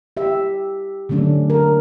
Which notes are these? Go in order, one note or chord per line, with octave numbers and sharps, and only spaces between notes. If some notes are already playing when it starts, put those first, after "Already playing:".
G4 E5
D3 F#3 A3 C#4 D4
A#4